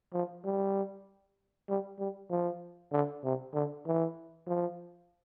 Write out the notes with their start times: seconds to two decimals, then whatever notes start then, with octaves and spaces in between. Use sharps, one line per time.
0.13 F3
0.45 G3
1.69 G3
1.99 G3
2.31 F3
2.92 D3
3.24 C3
3.54 D3
3.86 E3
4.47 F3